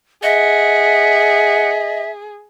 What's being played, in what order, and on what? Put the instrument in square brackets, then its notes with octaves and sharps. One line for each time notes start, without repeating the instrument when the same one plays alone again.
[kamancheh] G#4 [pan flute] D#5 [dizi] E5 [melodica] F#5